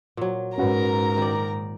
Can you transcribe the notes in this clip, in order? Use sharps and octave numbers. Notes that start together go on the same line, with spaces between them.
A#2 F#3
G#2 C#4 F#4 A#4 B4 A#5
D#3 D5